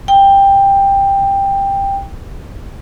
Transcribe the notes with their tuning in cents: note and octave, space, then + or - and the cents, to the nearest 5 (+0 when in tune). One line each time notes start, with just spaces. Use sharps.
G5 +10